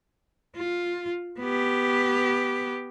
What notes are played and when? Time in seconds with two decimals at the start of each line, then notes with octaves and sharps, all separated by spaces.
0.56 F4
1.40 B3 G4